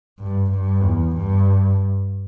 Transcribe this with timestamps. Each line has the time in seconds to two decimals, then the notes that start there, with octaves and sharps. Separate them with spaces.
0.19 G2
0.51 G2
0.83 E2
1.16 G2